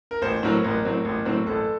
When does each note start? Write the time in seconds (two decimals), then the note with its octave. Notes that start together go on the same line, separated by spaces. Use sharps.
0.11 A#4
0.22 A1 C5
0.43 A2 F#3 C4 A#4
0.64 A1 A#4
0.85 A2 F#3 C4
1.05 A1
1.25 A2 F#3 C4
1.46 A1 A4